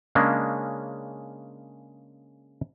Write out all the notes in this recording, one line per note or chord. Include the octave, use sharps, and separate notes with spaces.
C#3 G#3 A#3 C#4 D4